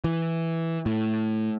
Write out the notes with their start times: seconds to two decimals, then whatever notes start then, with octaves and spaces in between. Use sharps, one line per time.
0.04 E3
0.86 A2